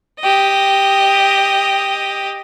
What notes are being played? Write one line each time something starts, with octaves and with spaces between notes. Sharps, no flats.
G4 D#5